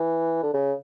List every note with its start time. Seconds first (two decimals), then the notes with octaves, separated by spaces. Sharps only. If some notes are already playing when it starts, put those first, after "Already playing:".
Already playing: E3
0.43 D3
0.54 C#3